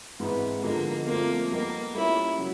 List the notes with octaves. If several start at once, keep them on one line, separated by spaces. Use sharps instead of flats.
G#2 E3 G#3 B3 C4
D3 F3 G#3 A#3 B3 D#4
F3 A3 A#3 C4
G3 A#3 B3 D#4 G4
G3 A#3 C#4 E4 F4
C#3 F#3